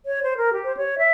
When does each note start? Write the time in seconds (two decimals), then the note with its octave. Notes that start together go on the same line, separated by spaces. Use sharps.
0.06 C#5
0.21 C5
0.37 A#4
0.52 G4
0.66 C5
0.75 C#5
0.98 E5